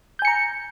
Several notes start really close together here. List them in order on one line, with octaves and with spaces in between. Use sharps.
G6 G#5 C#7 A#5